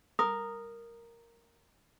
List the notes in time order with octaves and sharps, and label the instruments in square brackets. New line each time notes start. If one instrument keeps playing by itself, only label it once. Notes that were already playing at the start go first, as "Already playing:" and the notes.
[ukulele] A#4 [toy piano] D#6